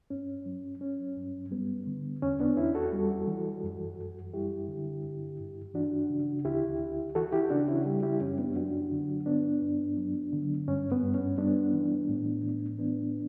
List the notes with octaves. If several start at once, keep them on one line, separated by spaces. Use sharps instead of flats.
G2 C#4
F#3
F#3 C#4
G2
G3 B3
D3
E2 C#4
B3 D4
E2 C#4 E4
F#4 A4
G3
E3
F#2
F#2
G3 E4 G4
D3
G2
G2
E3 D4 F#4
C#3
D2 E4 G4
D2
E3 F#4 A4
E4 G4
C#3 D4 F#4
C#4 E4
G3 E4 G4
E4 G4
F#2 C#4
B3 D4
F#3 D4 F#4
D3
G2 B3 D4
G2
F#3
D3
G2 C#4
B3
G2
C#4
G3 B3 D4
E3
A2
A2
E3 B3 D4